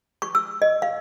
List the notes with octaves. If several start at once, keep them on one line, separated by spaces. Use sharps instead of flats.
C#6
E6
D#5
F5